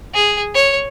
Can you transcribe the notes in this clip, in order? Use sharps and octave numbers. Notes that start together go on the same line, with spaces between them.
G#4
C#5